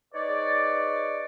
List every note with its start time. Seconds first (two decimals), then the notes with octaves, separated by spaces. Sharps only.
0.14 D#4 G#4 B4 C#5 D5